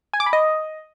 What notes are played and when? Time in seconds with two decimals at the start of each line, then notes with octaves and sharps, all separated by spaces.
0.14 G#5
0.20 D6
0.26 B5
0.33 D#5